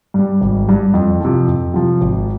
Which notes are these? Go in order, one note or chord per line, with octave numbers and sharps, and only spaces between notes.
G2 G3
G#1
G2 G3
F2
C3 F3
F2
C3 F3
G#1